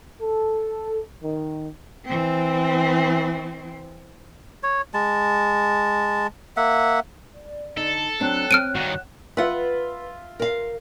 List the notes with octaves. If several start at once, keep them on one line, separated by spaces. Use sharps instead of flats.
A4
D#3
E3 C4
C#5
G#3 A5
A#3 E5 F#5
D5
D3 D#4 A4
F#3 C4 D4 C#5 G5 F#6
C4 F6 D7 D#7
G2 D#3 F#4
F4 B4 E5 F#5
A#4 F5